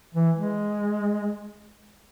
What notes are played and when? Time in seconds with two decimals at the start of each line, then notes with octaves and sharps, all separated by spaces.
0.14 E3
0.35 G#3